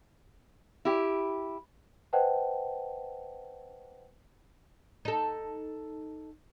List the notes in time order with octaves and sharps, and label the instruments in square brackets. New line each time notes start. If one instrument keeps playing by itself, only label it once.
[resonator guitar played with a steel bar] E4 G4
[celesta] B4 C5 D#5 F#5 G5 A5
[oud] D#4 A4